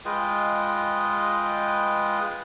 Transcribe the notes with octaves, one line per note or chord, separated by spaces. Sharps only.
G#3 F4 B4 D#5 G5